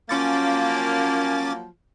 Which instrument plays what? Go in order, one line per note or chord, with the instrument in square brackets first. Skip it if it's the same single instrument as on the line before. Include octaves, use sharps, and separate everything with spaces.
[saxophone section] F3 F#3 A#3 [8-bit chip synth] C#4 D6 A6